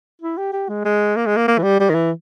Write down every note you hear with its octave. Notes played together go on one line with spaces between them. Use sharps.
E4
G4
G4
G#3
G#3
A#3
G#3
A#3
A#3
E3
G3
G3
D#3
E3